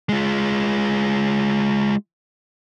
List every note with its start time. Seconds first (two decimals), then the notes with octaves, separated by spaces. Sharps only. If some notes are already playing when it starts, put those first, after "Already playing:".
0.09 G#3 F4